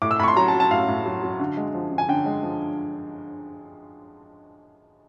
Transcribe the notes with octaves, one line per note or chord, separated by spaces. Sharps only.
A2 D6
E6
A2 B5 C#6
C6
F#3 A#5
A5
F#3
A5
A2 F5
A2
F#3
F#3
D3
G#3
F3
D3
G#5
D3 G5
G#3
F3